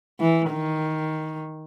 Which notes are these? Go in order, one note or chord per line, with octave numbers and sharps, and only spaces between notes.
E3
D#3